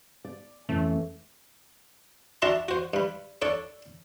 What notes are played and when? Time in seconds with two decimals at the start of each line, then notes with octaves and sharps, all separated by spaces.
0.25 D5
0.69 F2 E3 A3 C#4
2.42 D4 F#4 E5 A5 A#5 C6
2.68 F#4 C5
2.94 G2 B5
3.42 D4 A4 C#5 D5